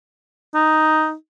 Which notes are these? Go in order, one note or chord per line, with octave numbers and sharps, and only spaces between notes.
D#4